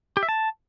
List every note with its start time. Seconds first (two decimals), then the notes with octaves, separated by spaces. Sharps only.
0.17 G4
0.23 E5
0.29 A5